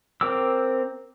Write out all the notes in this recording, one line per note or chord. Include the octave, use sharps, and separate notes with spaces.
C4 A#4 G5 D6 E6